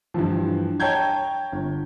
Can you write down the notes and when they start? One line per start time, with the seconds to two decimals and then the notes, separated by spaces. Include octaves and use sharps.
0.14 G2 E3 F3
0.80 C#5 G5 A5 A#5 G6 G#6
1.52 G1